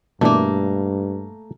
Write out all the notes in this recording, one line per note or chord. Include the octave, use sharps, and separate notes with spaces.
G2 B2 E3 A3 A#3 D4